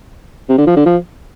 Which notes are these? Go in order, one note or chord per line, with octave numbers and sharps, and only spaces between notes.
C3
D3
F3
D3
F3